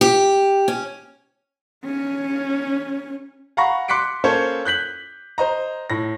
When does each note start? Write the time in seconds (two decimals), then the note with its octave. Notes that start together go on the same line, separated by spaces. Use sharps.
0.01 G4
0.68 C#4
1.86 C#4
3.57 F5 F#5 A#5 B5 C#6 A#6
3.88 C6 D6 F#6 B6 C#7 D7
4.24 A#3 C#4 A4 C5 C#5
4.65 F#6 G6 B6 F#7
5.38 C5 D#5 A#5
5.90 A2 A#6